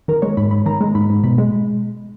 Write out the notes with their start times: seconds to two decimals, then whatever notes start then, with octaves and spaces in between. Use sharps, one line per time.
0.08 D#3 A#4
0.22 G#3 C#5
0.37 G#2 B5
0.51 G#2 B5
0.66 D#3 A#5
0.81 G#3
0.95 G#2 B5
1.10 G#2
1.24 B2 B5
1.38 G#3